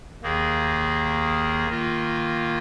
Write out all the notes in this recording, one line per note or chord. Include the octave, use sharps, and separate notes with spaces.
D#2 D#3 A#3 G#4
D#3 A#3 F4